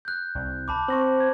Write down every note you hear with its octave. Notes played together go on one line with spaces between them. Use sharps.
F#6 G6
C2
A5 B5 D6
C4 C#6 A#6 F#7
G#6